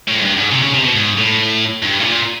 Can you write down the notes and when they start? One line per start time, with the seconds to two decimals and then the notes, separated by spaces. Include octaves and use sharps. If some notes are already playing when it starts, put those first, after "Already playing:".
0.08 A2
0.16 G#2
0.22 G2
0.37 G#2
0.51 C3
0.62 C#3
0.74 C3
0.84 B2
0.95 G#2
1.17 A2
1.82 G2
2.00 A2
2.04 A#2